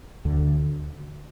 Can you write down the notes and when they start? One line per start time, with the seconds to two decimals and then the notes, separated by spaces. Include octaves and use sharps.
0.25 D2 D3